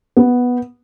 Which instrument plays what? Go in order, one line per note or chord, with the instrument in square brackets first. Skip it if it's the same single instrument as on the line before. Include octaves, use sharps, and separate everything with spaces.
[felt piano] B3